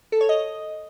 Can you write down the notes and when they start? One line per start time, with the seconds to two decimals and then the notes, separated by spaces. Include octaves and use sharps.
0.12 A4
0.21 C#5
0.29 D#5